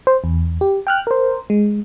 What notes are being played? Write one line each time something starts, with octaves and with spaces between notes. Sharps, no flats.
C5
E2
G4
G5 F6 F#6
A#4 C5
G#3